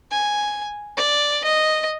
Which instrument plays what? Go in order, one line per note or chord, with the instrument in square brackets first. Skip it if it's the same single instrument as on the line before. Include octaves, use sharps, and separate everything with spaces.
[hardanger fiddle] G#5
D5
D#5